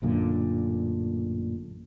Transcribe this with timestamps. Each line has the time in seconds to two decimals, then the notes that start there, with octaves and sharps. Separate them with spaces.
0.02 A1 F#2 A#2 D3